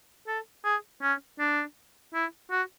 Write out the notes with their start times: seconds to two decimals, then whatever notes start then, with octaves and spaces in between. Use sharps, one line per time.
0.27 A4
0.65 G#4
1.02 C#4
1.39 D4
2.14 E4
2.51 F#4